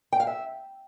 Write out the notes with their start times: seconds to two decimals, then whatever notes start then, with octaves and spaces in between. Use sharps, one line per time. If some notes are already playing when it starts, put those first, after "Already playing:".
0.13 G5
0.20 F5
0.27 E5